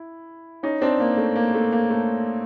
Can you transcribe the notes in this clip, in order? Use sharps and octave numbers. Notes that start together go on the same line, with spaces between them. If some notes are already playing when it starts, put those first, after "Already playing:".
Already playing: E4
C#4 D#4
C4 D4
A#3
A3
A#3
A3
A#3
A3